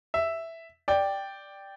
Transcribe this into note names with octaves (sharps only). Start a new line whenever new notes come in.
E5
D5 G5